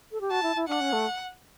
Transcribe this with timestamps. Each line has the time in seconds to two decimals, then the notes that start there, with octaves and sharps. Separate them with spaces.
0.12 A4
0.21 G4
0.30 F#4 A5
0.43 E4
0.56 E4
0.68 D4 F#5
0.81 C#4
0.93 A3